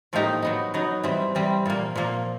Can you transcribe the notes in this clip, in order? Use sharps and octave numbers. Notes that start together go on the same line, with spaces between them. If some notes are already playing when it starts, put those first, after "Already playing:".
A2 F3 A#3 D#4 G4
F#3 B3 D#4
F#3 B3 D#4
E3 G3 C4
E3 G3 C4
A#2 F3 A#3
A#2 F3 A#3